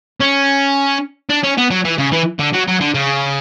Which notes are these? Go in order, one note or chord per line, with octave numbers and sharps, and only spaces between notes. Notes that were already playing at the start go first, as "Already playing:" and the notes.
C#4
D4
C#4
B3
F#3
E3
C#3
E3
D3
F#3
F#3
D3
C#3